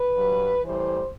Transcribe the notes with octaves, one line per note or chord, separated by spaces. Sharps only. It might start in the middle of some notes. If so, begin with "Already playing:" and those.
Already playing: B4
G2 F#3
A2 E3 G3 C5